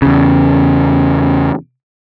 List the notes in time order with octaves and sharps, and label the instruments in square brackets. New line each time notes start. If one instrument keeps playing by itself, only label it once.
[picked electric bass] E2 C#3